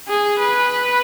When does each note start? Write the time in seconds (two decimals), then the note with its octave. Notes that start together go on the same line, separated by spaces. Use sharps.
0.08 G#4
0.39 B4